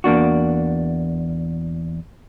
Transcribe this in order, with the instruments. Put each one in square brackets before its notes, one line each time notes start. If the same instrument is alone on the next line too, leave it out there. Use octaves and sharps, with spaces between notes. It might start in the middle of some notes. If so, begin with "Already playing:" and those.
[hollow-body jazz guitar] E2 A#3 D4 F#4